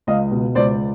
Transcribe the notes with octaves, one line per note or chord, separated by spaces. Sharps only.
C#2 D#5 F5
B2
C#2 C5 D5